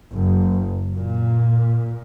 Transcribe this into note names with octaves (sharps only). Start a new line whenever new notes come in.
F#1
A#2